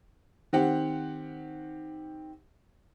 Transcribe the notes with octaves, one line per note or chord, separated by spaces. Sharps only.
D#3 C4 G4 F#5